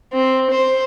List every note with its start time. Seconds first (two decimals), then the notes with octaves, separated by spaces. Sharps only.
0.13 C4
0.50 C5